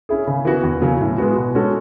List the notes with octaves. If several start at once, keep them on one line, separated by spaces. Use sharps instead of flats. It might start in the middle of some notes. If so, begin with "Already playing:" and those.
C#4 E4 G#4
C#3
E3 B3 F#4
E2
C#3 F#3
A2
G#3 B3 F#4
B2
G#3 C#4 F#4 A4